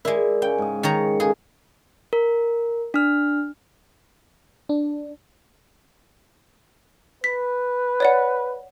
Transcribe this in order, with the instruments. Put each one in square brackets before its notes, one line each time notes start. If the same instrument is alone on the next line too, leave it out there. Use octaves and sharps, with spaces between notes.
[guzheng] G#3 E4 [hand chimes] A#4 D5
[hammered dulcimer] C#3 [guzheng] G5
[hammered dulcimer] G#2 [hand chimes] G#5 D#6
[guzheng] D#3 C#5 A#5 [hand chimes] C#7
[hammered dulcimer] C#3 [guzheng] G#4 [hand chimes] A4
[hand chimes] A#4
D4 F6
[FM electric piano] D4
[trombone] B4 [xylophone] B6
[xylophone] C#5 D5 F#5